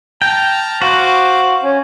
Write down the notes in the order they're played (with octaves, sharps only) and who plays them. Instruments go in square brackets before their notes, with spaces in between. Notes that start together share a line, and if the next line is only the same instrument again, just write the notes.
[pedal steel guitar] G5 [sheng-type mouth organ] A5 A#5 F6
[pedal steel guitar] F#4 [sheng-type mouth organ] C5 F5 D6
[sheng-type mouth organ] C#4